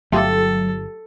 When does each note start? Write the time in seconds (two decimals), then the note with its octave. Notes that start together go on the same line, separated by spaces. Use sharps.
0.12 G1 F#3 A3 F4 G4 A4